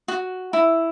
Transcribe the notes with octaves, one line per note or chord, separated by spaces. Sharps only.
F#4
E4